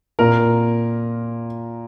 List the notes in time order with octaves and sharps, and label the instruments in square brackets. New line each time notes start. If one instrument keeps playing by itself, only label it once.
[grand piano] A#2 A#4